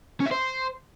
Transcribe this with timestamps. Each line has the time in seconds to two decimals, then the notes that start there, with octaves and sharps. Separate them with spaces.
0.20 C#4
0.26 E5
0.31 C5